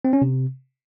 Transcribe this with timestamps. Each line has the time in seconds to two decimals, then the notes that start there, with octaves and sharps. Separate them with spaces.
0.05 C4
0.13 C#4
0.22 C3